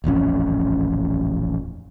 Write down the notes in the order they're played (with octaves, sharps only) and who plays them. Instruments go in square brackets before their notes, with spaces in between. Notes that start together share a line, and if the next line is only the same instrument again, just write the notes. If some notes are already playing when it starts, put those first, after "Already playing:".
[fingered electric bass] D#1 A1 F2 C#4